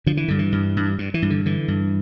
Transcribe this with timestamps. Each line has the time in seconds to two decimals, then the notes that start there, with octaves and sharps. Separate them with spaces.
0.06 D3 F3
0.17 E3
0.28 G2 D3
0.39 E3
0.52 G2
0.77 G2
0.98 G2
1.14 E3
1.22 G2
1.30 D3
1.46 D3 E3
1.68 G2